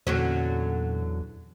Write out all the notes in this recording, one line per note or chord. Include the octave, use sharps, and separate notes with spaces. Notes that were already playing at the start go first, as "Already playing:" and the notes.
E2 A#2 D3 F#3 C#4